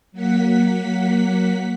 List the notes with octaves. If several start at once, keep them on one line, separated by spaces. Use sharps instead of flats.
F#3 A#3 F#5 B6